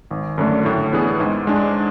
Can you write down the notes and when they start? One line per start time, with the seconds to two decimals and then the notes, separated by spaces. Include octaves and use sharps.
0.11 G#1
0.38 F#2 D3 A3 D4
0.65 A2
0.93 E3 B3 D4 G#4
1.20 G#2
1.47 G#3 D4